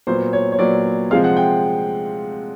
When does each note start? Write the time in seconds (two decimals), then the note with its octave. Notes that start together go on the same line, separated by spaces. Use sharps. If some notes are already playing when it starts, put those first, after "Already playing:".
0.07 A#2 F#3 B3 C5
0.33 C#5
0.52 C#5
0.59 A#2 F#3 B3 D5
1.10 C3 F3 G#3 C4 F5
1.24 F#5
1.37 G5